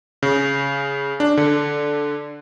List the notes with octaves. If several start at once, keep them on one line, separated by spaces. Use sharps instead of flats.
C#3
D4
D3